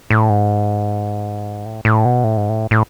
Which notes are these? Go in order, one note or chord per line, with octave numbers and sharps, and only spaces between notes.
A2
G#2
A2
A2
B2
A2
G#2
A2
A2